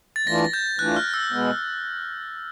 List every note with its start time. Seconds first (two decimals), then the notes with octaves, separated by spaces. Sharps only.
0.16 A6
0.27 E3 A3 D4 F4 A#6
0.53 G6
0.79 E3 A3 D4 F4 F#6
0.96 F6
1.14 E6
1.32 B2 G#3 B3